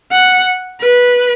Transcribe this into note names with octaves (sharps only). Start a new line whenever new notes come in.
F#5
B4